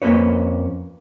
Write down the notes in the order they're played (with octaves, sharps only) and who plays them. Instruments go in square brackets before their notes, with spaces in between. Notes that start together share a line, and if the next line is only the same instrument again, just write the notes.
[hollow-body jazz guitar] F2 A#3 C#4 B4 C#5